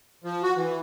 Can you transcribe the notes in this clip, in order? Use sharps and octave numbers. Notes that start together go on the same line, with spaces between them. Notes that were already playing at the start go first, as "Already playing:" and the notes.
F3
F#4
E3